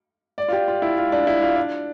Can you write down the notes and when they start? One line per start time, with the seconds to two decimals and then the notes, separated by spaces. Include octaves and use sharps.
0.38 D5
0.48 F4
0.52 G4
0.68 F4
0.82 E4
0.98 F4
1.12 D4
1.27 E4
1.42 F4
1.56 D4